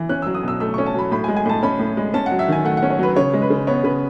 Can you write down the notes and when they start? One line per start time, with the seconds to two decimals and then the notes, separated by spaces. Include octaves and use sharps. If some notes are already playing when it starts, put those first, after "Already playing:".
Already playing: E3
0.09 C#4 F#6
0.22 F#3 E6
0.34 D#6
0.43 B2 E6
0.60 A3 E6
0.74 C#4 C#6
0.86 A5
0.95 F#3 B5
1.11 A2 B5
1.24 G#5
1.28 G#3
1.37 G#5
1.45 A2 A5
1.63 C#4 B5
1.79 A2
1.97 G#3
2.14 C#4 A5
2.26 F#5
2.31 F#3
2.39 E5
2.48 D#3 G#5
2.65 A3 F#5
2.77 F#5
2.83 C#4
2.90 C#5
2.99 F#3 B4
3.16 C#3 C#5
3.34 G#3
3.42 B4
3.50 C#3
3.67 B3 C#5
3.84 C#3 B4